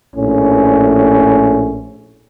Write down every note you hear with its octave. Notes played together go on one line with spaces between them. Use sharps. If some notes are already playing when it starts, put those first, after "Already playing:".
A#1 A2 C#4